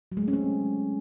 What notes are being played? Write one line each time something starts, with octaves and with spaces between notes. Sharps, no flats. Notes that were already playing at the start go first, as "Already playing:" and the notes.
F#3
G#3
A3
C#4
C4